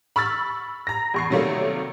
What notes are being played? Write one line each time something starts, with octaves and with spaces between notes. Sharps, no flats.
B5 C#6 E6 F6 A6
A#5 A#6
E2 C#6 C7
C3 D#3 F#3 G3 A3 A#3